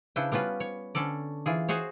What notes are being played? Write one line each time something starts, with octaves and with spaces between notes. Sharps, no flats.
C#3 D4 E4 B4 G5
G3 B3 C#4 F4 B4
C#5
D3 C#4 A4 D5
E3 F4 G#4
F#4 G#4 C5 C#5